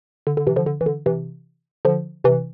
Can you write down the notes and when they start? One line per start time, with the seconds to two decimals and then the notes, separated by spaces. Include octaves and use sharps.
0.27 D3
0.37 D3
0.47 C3 E3
0.56 D3 F3
0.66 D3
0.81 E3
0.86 D3
1.06 C3 E3
1.85 D3 F3
2.24 C3 E3